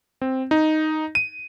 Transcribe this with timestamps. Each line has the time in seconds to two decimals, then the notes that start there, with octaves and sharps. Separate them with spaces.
0.22 C4
0.51 D#4
1.15 D#7